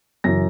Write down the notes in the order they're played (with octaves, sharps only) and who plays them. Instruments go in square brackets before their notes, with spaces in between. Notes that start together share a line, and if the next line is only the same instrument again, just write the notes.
[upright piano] F#2 C#3 E3 A#6